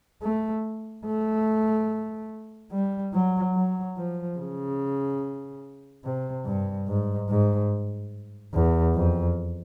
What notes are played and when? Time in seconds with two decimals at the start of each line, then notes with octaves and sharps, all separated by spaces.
0.22 A3
1.06 A3
2.71 G3
3.13 F#3
3.55 F#3
3.96 F3
4.38 C#3
6.04 C3
6.45 G2
6.87 G#2
7.29 G#2
8.53 E2
8.95 F2